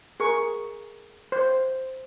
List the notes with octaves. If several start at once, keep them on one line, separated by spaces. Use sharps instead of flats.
G#4 A#4 C#6
C5